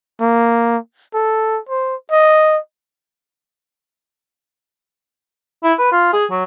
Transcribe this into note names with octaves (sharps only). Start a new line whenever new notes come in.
A#3
A4
C5
D#5
E4
B4
F4
G#4
F#3